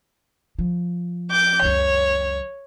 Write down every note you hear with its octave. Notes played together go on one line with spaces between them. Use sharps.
F3
D6 G6
C#2 F#2 C#5